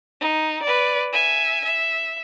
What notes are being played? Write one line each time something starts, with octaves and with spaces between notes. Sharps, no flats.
D#4
B4 D5
E5 G#5
E5